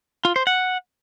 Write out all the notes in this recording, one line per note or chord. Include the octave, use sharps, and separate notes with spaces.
F4
C5
F#5